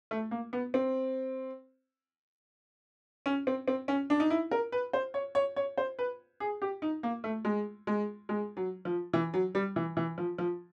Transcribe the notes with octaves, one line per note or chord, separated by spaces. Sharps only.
A3
A#3
B3
C4
C#4
C4
C4
C#4
D4
D#4
E4
A#4
B4
C5
C#5
C#5
C#5
C5
B4
G#4
G4
D#4
A#3
A3
G#3
G#3
G#3
F#3
F3
E3
F#3
G3
E3
E3
F3
F3